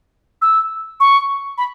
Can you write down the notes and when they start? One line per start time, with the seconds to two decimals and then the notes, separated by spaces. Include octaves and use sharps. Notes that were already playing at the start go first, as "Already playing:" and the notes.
0.42 E6
1.00 C#6
1.58 B5